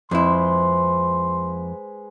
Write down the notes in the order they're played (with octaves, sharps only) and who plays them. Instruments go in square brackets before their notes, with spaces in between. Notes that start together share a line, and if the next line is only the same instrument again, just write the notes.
[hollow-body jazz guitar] F2 E4 [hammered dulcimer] G#3 B4 C5 [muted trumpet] C6